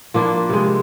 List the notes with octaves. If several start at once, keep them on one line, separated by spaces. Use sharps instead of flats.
F3 A#3 D4 E4
C3 G#3